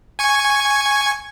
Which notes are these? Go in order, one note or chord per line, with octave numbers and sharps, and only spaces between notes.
G#5 C#6 G#6